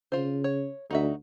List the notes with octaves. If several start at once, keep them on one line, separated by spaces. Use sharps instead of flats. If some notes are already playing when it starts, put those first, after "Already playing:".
C#3 F4 C5
C#5
D2 D#4 F#4 E5